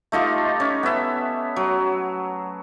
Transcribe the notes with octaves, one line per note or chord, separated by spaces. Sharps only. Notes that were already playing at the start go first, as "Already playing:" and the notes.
A3 D#4 F4 G4
C#4
B3 E5
F#3